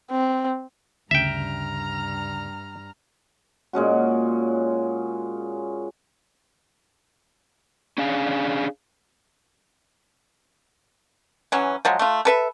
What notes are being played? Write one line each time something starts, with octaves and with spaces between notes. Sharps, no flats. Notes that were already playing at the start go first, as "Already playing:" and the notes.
C4
D2 G2 C#3 E5 G5 A#5 F6
A#2 G#3 C#4 F#4
C#4 D4 G#4 F5
E3 F#3 C#4
F3 F#3 G#3
A3 F4
A4 B4 E5